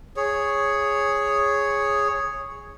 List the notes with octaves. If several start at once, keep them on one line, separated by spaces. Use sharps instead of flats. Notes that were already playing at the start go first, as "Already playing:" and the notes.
G#4 C#5